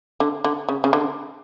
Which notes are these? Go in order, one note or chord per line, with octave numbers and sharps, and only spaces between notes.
D3
D3
C#3
C#3
D3